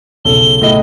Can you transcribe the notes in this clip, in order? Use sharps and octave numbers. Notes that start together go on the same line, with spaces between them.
B1 C#3 A4 G7
A2 D#5